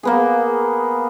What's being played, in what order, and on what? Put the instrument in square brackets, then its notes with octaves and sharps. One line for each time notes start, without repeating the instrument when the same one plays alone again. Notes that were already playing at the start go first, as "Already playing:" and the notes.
[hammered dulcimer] A#3 B3 G#4